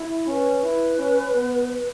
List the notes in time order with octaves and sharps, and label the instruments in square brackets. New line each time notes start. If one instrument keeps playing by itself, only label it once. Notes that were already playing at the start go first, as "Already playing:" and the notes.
Already playing: [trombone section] E4
[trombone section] C#4 [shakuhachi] B4
[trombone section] E4
C#4
B3